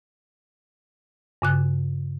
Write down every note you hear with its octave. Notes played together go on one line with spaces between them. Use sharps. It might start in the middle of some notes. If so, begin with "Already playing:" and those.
G2 C#3 F#6